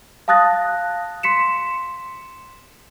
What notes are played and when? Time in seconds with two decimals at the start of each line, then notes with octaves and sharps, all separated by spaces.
0.28 F5 A5 D#6 F#6 A6 A#6
1.23 C6 B6 C#7 E7